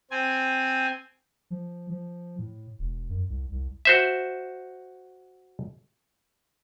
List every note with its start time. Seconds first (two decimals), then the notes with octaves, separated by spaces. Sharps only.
0.11 C4 G#5
1.50 F3
1.90 F3
2.39 A2
2.79 E1
3.10 F#2
3.29 C2
3.51 C2
3.85 F#4 C5 E5